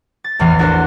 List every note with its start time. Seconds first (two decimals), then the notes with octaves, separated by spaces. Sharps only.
0.24 A6
0.39 A1 E2 E3 F6 C7
0.59 D4 F#4 A4 A#4 C5